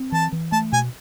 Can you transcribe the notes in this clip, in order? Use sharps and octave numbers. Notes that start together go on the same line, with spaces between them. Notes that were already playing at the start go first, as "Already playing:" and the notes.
Already playing: C4
E3 A5
E3
A3 A5
B2 G#5